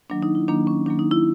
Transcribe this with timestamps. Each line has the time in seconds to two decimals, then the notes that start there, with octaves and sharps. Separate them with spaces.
0.10 D#3 F#3 A#3 D4
0.23 D#4
0.35 E4
0.48 D#3 F#3 A#3 D4
0.67 C#4
0.86 D#3 F#3 A#3 D4
0.99 D#4
1.11 E4